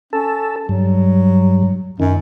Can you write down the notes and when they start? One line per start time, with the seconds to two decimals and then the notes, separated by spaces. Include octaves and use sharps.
0.13 C#4 A4
0.69 G2 F#3
2.00 F#2 D#3